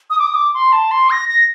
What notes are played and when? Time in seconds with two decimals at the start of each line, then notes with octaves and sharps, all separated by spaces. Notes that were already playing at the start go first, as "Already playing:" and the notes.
0.10 D#6
0.19 D6
0.27 D#6
0.35 D6
0.54 C6
0.72 A5
0.91 C6
1.10 A#6
1.29 A#6